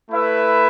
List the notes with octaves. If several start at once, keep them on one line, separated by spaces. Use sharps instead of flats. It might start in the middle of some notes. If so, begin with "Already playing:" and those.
A3 E4 B4 E5